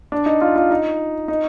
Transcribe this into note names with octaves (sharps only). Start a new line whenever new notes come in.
D4
D#4
F4
F4
D#4
D#4